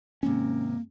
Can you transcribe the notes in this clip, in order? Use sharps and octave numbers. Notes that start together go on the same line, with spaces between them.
D#2 G#2 C3 A#3 C#4